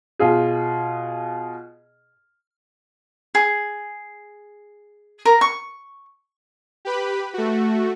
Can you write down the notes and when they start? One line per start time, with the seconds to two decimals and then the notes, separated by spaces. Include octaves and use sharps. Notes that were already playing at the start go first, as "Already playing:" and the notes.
0.19 B2 F4 G#4
3.35 G#4
5.25 A#4
5.41 C#6
6.85 G4 B4 B5
7.34 A3 F#4